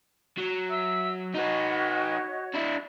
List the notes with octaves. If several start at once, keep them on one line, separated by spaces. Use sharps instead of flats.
F#3
E5 E6
D#4 F#4 B4 C#5 D#5
D4 E4